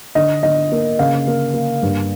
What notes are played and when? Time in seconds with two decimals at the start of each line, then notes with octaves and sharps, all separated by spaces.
0.15 D3 D#5
0.43 D3 D#5
0.72 A#3
0.99 C#3 F5
1.27 A#3
1.54 A#3
1.83 G2